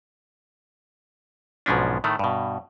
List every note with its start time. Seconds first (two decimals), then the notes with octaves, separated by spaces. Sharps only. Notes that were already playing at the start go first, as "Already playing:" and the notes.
1.66 B1 G#2 B2 F3 C#4 D4
2.04 A2 D#3 A3
2.19 G2 B2